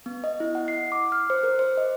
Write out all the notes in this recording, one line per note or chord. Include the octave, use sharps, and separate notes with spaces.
B3
D#5
E4
F#5
C7
D6
F6
C5
A#4
C5
D#5